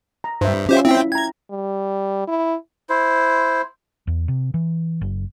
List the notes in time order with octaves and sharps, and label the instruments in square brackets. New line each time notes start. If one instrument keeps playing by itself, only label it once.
[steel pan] A#5
[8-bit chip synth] G2 [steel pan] C5 E5
[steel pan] C#4 F4 D#5 [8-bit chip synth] G4 C5 E5
[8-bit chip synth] C4 G5 [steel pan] E4 E5
[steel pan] G5 A#5 [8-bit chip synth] G#6
[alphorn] G3
E4
[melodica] E4 C5
[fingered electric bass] E2
C3
E3
F#1